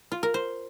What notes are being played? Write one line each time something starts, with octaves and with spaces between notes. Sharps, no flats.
F4
A#4
C5